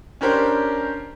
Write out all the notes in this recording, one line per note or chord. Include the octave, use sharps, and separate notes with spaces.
C#4 D4 G4 A#4 C5